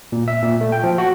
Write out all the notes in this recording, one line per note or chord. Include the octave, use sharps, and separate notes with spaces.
A#2
E5
A#2
A3
G5
F3
F#4